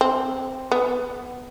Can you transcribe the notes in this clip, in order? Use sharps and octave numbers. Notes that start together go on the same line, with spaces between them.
C4
B3